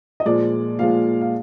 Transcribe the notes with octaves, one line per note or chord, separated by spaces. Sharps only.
D#5
A#2 F3 G#3 D5
A#2 F3 G#3 F5
F5